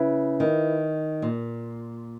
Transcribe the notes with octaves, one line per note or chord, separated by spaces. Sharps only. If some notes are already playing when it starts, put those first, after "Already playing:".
Already playing: C#3 E4 B4 E5
D#3
A#2